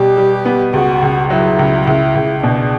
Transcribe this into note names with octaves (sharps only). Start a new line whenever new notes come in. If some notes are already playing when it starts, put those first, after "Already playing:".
Already playing: B2 G3 G4
G3
B3
C#2 F#4
C#2
F#3 E4
C#2
C#2 E4
C#2
B2 D4